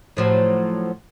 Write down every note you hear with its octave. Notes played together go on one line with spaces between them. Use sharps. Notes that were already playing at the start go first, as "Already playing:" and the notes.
A2 F3 F#3